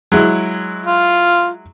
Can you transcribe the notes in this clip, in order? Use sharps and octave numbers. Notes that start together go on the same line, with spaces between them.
F#3 G#3 E4
F4